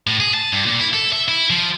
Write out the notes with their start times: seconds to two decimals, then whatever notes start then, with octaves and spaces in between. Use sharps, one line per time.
0.07 A2
0.20 G#4
0.34 A5
0.53 G2
0.66 A#2
0.79 E4
0.93 A4
1.13 E5
1.28 E4
1.50 F3